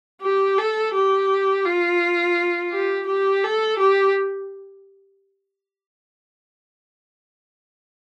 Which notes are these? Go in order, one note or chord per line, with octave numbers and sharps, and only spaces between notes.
G4
A4
G4
F4
G4
G4
A4
G4